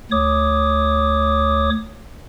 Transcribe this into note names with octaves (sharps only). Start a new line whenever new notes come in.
D2 C#5 D6 D#6